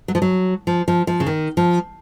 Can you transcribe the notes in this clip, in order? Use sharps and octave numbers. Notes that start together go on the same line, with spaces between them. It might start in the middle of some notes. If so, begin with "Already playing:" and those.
F#3
F3
F#3
F3
F3
F3
C#3
D#3
F3